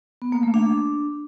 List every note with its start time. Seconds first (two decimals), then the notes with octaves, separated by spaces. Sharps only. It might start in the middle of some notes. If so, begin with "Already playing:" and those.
0.22 B3
0.32 A#3
0.43 A3
0.54 D4